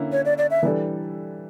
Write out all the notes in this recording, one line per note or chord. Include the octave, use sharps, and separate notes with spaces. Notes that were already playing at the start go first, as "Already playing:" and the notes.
Already playing: D3 A#3 C#4 E4
C#5
D5
D5
E5
E3 G3 D4 A4